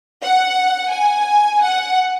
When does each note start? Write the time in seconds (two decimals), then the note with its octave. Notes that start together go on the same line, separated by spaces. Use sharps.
0.22 F#5
0.91 G#5
1.61 F#5